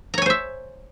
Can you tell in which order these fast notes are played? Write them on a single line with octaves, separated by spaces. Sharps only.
A#5 C#5 G#5 C5 E5